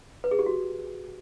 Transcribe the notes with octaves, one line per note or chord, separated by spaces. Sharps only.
B4
G#4
G4
F#4